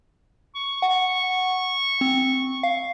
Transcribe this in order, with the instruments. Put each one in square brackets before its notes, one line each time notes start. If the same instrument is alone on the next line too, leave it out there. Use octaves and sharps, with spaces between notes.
[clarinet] C#6
[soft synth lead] F#5
C4
F5